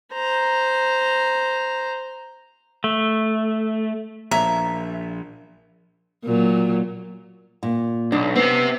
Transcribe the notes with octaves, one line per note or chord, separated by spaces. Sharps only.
C5 A#5
A3
A#1 C#5 E5 A#5
A#2 F#3
A#2
B1 D4
C3 B3 C4